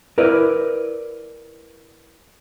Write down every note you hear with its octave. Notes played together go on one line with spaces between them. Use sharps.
E4 A#4 B4 D5